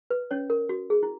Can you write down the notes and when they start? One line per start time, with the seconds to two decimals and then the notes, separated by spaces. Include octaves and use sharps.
0.10 B4
0.31 C#4 C#5
0.50 A#4
0.69 F#4
0.90 G#4
1.03 E4